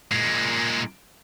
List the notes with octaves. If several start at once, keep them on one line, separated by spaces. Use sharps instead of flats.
A#2 G#3